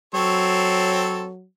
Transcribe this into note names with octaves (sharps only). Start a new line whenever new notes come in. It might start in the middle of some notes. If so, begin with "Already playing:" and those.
F#3 C4 A4 C#5